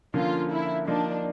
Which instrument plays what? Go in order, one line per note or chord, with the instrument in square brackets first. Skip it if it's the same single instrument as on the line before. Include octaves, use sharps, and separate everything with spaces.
[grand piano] D3 F3 A#3 C#4 [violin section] F4
[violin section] E4
[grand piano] F3 A#3 D#4 [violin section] D4